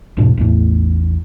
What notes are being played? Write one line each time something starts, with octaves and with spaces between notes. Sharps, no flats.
E1 G#2 B2 D4
A1 E2 A2